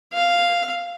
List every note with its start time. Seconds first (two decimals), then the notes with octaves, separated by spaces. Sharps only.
0.13 F5